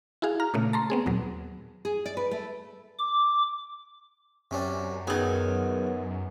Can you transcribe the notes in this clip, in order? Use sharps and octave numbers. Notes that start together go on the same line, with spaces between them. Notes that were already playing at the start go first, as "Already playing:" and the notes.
E4 F#4 G#4 F5
A#5 F6
A#2 C#3 A3
A5 A#5 C6
B3 C4 G#4
D#2 A#2 F#3
G#4
D5
B4
A3
D6
F#2 C3 C#4 D4
D#3 F#3 B3 G#4 D#5